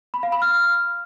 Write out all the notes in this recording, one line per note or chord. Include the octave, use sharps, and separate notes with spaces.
B5
F5
B5
F6